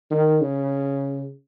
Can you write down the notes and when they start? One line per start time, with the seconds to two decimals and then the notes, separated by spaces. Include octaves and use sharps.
0.11 D#3
0.41 C#3